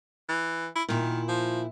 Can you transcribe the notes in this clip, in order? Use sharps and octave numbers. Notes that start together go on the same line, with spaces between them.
E3
E4
A#2 D#3 E4
F3